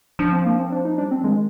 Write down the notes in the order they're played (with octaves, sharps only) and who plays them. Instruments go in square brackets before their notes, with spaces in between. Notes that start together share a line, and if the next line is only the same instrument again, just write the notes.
[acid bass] F3 [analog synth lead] D4
[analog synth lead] C4
A#3
C4
D4
D#4
[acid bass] G3 [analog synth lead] D4
[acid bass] F3 [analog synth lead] C4
[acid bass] D#3 [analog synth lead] G#3